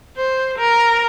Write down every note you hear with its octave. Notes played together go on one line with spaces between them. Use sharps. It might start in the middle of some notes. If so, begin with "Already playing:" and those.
C5
A#4